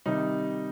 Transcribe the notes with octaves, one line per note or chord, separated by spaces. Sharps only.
C3 D#3 G3 D#4